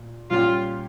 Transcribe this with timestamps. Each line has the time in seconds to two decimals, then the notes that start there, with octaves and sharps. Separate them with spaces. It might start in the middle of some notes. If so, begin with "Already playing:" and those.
Already playing: A#2
0.31 A#2 G3 C#4 F4 G4